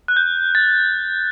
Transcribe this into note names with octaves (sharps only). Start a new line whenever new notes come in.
F#6
G6
A6